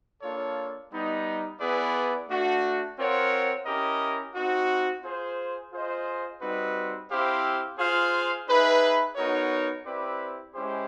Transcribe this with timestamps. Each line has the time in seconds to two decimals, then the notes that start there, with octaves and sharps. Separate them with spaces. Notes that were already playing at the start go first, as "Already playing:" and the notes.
0.22 A#3 D4 F4 A4 C#5
0.91 G3 B3 D#4
1.59 B3 E4 G#4 B4 D5
2.28 A3 D4 F#4
2.97 C4 F4 A#4 C#5 F#5
3.66 C#4 E4 G4 A#4 D#5
4.35 C4 D#4 F#4
5.03 F4 G#4 C5
5.72 F4 G#4 C5 D#5
6.41 G3 C4 D#4 F#4 B4
7.10 C4 E4 G4 C5 F5
7.78 F4 G#4 C5 F5
8.47 D#4 G#4 B4 E5
9.16 B3 D#4 F#4 A#4 C#5
9.85 C4 E4 G4 B4 D5
10.54 G#3 C#4 E4 G4 C5